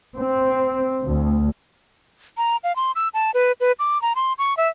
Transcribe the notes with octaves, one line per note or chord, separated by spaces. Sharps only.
C4
D2
A#5
F5
C6
E6
A5
B4
B4
D6
A#5
C6
C#6
E5